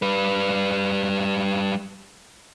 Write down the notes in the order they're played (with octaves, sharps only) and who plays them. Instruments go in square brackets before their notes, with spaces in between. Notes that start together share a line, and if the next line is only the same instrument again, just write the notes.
[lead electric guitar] G3 B4